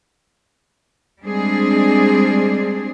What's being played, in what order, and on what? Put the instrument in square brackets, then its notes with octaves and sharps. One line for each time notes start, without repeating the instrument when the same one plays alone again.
[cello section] G3 G#3 C4 D4 G#4